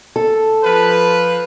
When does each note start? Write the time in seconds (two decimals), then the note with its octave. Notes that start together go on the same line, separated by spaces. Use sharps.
0.16 A4
0.64 F3 B4